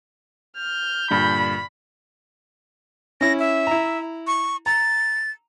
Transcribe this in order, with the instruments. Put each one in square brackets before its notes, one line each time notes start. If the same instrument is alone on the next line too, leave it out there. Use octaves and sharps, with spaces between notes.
[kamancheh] F6 [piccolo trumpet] G6
[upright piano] G2 A#2 D3 [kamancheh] B5
[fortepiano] C#4 E4 [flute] A#6
[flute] E5
[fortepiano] E4 A#5
[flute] C#6
[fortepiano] A#5 [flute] A6